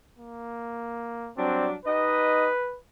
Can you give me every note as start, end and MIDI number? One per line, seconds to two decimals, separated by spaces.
0.17 1.32 58
1.37 1.74 54
1.37 1.74 55
1.37 1.67 60
1.37 1.74 62
1.86 2.48 63
1.86 2.48 67
1.86 2.78 71
1.86 2.48 75